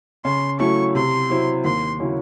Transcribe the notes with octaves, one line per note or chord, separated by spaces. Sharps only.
C#3 C6
F#3 A3 C#4 E4 C#6
C3 C6
F#3 C4 E4
D#2 C6
C#3 F#3 C#4 E4